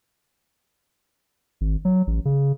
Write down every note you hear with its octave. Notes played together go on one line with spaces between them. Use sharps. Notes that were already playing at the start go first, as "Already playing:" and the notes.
G#1
F#3
A1
C#3